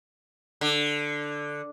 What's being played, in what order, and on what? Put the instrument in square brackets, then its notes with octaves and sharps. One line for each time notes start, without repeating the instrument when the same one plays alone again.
[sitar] D3